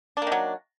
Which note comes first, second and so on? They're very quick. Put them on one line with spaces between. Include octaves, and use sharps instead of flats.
D4 A#3 D#3 F#3